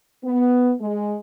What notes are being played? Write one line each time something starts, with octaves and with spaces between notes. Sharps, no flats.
B3
G#3